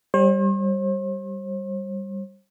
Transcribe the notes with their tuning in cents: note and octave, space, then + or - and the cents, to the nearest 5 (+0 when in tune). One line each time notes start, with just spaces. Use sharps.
G3 +0 C5 +45